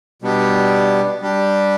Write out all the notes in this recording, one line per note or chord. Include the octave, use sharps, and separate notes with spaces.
B2 G3 B3 D4 G4
G3 D4 G4